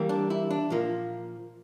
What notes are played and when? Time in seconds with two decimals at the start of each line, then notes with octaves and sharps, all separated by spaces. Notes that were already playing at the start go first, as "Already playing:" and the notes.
Already playing: E3 G3 A#3
0.09 D4
0.30 E4
0.51 D4
0.70 A#2 F3 A#3